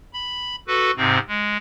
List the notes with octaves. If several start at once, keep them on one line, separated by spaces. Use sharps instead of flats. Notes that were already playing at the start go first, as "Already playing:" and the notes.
B5
F#4 A4 B4
G#2 C3 C4
G#3